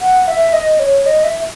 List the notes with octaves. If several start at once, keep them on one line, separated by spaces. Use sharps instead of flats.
F#5
E5
D#5
C#5
D#5
E5